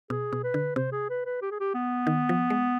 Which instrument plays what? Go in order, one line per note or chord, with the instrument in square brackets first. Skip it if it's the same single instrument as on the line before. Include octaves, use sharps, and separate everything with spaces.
[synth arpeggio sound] B2 [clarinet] G#4
[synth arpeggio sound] B2
[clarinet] B4
[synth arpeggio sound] D3
[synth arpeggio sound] C3 [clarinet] C5
[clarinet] G#4
B4
B4
G4
G#4
G4
B3
[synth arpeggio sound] D#3
F3
G#3